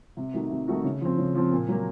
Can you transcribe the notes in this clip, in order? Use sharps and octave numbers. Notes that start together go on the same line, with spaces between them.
C3
D#3 A3 D#4 F#4
C3
D#3 A3 D#4 F#4
C#3
F3 C4
C#3
F3 C4
A#2
F#3 A#3